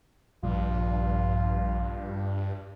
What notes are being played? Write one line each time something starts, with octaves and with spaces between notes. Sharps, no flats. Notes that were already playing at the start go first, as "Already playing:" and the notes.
A#1 G2 F4